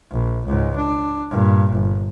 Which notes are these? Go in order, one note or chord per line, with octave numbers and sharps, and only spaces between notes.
A#1
C#2 G#2
D4
G2 A#2
G1